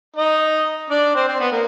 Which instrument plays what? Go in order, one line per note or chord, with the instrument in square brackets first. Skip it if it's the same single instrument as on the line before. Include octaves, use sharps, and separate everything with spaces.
[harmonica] D#4 D#5
D4 D5
C4 C5
C4 C5
B3 B4
A#3 A#4